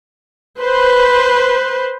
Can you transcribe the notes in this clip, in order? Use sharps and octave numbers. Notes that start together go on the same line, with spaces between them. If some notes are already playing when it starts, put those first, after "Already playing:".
B4 C5